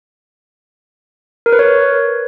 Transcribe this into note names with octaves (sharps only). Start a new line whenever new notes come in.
A#4
B4
C#5